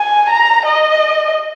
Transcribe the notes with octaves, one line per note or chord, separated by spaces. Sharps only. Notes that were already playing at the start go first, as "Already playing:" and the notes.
Already playing: G#5
A#5
D#5